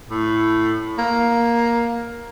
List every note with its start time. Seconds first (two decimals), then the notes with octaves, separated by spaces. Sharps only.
0.10 A2
0.98 A#3